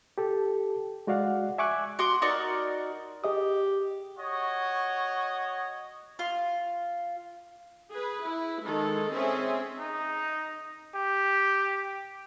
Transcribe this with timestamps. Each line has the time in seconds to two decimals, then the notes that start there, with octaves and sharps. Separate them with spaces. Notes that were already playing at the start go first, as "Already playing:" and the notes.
0.18 G4 A4
1.07 G#3 F#4 D5 F5 F#5
1.58 E5 G#5 C#6 D6 E6 F#6
1.99 F#4 C6 D6
2.22 D#4 F#4 A#4 D5
3.24 G4 G#4 D#5 D#6
4.19 F#4 C#5 D#5
6.19 F4
7.91 G#4 B4
8.25 E4
8.64 D#3 G#3 A4
9.12 C4 C#4 G#4 E5
9.79 D#4
10.95 G4